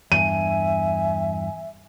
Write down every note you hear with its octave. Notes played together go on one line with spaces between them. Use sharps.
E2 G2 E5 G#5 D#7